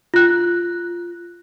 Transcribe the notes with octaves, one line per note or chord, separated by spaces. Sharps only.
F4 F#6